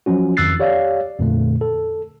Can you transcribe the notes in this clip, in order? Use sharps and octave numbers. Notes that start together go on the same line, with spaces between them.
F3 F#3 C#4 F#4
F2 D#3 E6 F#6 A6 C7
G4 C#5 D5 F5
F2 A#2 D3 A3
A4